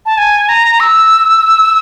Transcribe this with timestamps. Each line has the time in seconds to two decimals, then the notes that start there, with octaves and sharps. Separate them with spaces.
0.06 A5
0.18 G#5
0.49 A#5
0.80 E6